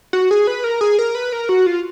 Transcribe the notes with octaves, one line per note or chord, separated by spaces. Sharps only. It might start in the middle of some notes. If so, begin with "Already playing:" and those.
F#4
G#4
B4
A#4
G#4
A#4
B4
A#4
F#4
F4